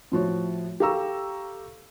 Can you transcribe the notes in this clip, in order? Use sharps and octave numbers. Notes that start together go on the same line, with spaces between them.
A2 F3 F#4 C#5
G4 A4 F5 A#5 C#6 E6